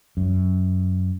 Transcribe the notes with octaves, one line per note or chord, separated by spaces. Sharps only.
F#2